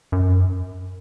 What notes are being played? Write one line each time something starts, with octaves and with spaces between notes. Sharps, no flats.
F#2